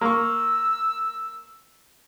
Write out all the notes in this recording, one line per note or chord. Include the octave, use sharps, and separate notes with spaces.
A#3 C#6 E6